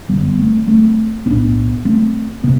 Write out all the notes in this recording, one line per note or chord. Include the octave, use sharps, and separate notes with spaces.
G1 F#2 D3 G3 B3
A3 C4
A3 C4
B1 A2 B3 D4
A3 C4
C3 B3